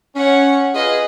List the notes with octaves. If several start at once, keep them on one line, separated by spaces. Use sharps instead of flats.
C#4 C#5 F#5
F4 G#4 B4 D#5